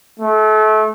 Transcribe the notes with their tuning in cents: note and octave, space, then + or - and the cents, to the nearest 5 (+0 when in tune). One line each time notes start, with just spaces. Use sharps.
A3 -30